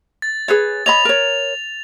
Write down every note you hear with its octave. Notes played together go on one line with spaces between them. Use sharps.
A6
G#4 B4 C#5
C#5 D#5 B5 F7
A#4 C#5